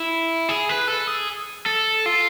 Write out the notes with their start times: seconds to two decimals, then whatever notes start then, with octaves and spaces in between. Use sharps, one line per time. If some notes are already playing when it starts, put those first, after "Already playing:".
Already playing: E4
0.49 G#4
0.69 B4
0.88 A4
1.07 G#4
1.66 A4
2.06 F4